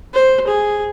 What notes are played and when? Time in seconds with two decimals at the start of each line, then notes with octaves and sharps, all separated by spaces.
0.13 C5
0.47 G#4